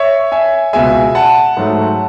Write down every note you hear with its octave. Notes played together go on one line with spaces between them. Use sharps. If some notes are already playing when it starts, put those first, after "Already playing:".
Already playing: C#5 E5
E5 G#5
C#2 B2 G#3 E5 G#5
F#5 A5
G#2 F#3 A3